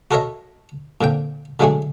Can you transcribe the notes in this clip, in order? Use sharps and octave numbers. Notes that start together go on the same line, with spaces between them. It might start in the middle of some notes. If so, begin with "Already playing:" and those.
F#4 A4 A#4 C#5 D#5 E5
A#2 D3 C4 G5
D3 F#3 G#3 A3 D4 G#4